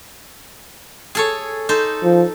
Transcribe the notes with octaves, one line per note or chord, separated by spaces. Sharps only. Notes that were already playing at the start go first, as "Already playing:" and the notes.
G#4 A4 C#5
D#4 A4 C5
F3